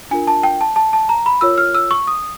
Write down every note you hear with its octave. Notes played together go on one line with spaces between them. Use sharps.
D4 F4 A#4 G#5
A5
G5
A5
A5
A5
A#5
B5
F4 A#4 C#5 E6
F6
E6
C#6
D#6